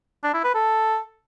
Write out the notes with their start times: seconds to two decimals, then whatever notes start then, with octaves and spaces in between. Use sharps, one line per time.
0.23 D4
0.34 E4
0.44 B4
0.54 A4